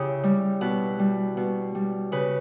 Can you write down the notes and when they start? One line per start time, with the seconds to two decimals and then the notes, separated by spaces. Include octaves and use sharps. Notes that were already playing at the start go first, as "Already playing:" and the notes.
Already playing: C#3 C#4 E4 G4
0.23 G3
0.61 B2 B4
0.99 G3
1.37 B2
1.75 G3
2.12 C#3 B4